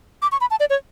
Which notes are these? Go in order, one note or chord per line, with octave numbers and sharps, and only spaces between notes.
D6
C#6
B5
A5
D5
C#5